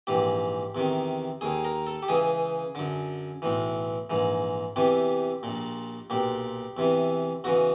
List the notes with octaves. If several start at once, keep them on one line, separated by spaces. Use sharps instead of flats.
A#1 G#2 E3 G4
E2 C3 D#3
D#2 D#3 G#4
A#4
A4
G4
C#2 C#3 E3 G#4
F#2 D3
B1 A2 E3
A#1 G#2 E3
E2 C3 E3 G4
A#1 A#2
B1 A#2 G4
E2 C3 E3
E2 C#3 E3 F#4